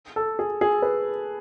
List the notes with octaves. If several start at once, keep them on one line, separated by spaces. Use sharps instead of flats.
A4
G#4
G#4
B4